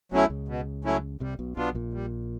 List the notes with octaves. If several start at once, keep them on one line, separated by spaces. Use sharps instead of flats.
B1 B2 F#3 A3 C#4 E4
C#2 C#3
B2
F#3 A3 C#4 E4
C2 C3 G3
B1 B2
B1 B2 B3 D4 F4
A#1 A#2
G3